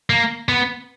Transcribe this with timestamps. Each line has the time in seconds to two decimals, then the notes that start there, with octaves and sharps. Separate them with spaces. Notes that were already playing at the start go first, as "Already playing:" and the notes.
0.10 A#3
0.49 B3